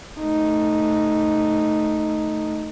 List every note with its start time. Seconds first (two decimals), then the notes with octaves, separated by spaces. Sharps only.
0.20 A3 D#4